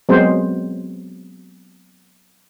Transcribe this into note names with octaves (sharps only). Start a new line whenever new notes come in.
F#3 G#3 B3 C4 C5